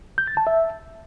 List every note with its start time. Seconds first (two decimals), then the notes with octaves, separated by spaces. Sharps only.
0.18 G6
0.27 A6
0.37 A5
0.47 E5